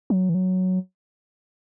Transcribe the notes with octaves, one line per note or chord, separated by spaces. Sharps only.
F#3
E3
F#3